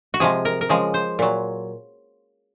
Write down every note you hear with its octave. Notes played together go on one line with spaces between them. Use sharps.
F#4
C3 F3 G#3 G#4
A#4
A#4
C#3 F3 G#3 G#4
C5
A#2 F#3